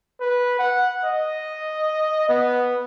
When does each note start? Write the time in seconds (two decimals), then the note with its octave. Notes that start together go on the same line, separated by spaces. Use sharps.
0.21 B4
0.59 F#5
1.04 D#5
2.29 B3